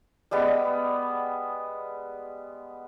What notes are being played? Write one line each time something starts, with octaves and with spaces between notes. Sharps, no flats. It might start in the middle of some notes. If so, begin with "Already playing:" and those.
G3 G#3 B3